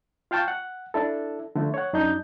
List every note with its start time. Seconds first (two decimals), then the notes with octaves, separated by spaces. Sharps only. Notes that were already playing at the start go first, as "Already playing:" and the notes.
0.31 F4 F5 G5 A5 C#6
0.48 F#5
0.94 D4 E4 A4
1.55 D3 F3 A3
1.74 C#5 F#5
1.93 F#2 D4 D#4 G6